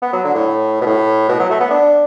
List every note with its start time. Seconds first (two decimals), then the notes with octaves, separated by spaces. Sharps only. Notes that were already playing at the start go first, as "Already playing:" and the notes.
0.02 B3
0.13 F#3
0.24 D3
0.35 A2
0.81 B2
0.87 A2
1.29 B2
1.39 F#3
1.50 A3
1.60 B3
1.71 D4